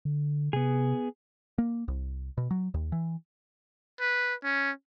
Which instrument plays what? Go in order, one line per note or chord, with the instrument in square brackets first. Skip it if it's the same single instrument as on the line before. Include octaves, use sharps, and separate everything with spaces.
[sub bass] D3
[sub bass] C3 [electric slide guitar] B3 G#4
[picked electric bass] A#3
C2
B2
F#3
D#2
E3
[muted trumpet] B4
C#4